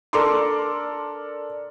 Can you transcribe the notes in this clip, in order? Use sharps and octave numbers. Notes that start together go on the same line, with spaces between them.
D4 A4 A#4 A#5 C6 D6